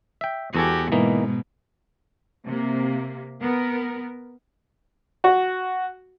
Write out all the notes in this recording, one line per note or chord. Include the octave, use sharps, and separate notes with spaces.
E5 G5
E2 F#4 G4 A4 G#5
G#2 B2 E3 A#3 D#4
C3 A#3
B3 A#4
F#4